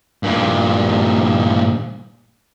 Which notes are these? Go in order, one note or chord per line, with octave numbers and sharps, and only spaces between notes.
G2 A#2